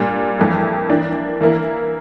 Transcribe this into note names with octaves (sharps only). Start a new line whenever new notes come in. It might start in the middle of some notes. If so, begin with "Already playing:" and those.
Already playing: A#2 G3 D4
F2 E3 A#3 E4
E3 A#3 D4
E3 A#3 E4 A#4